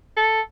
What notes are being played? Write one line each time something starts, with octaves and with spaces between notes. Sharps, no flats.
A4